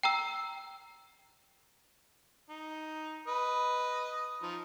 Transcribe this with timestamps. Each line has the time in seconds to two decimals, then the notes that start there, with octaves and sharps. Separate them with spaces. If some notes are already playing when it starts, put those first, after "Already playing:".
0.03 G5 A#5 E6
2.49 D#4
3.27 B4 D#5
4.42 F3 D#4